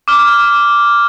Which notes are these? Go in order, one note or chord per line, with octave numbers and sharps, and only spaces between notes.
D6 F6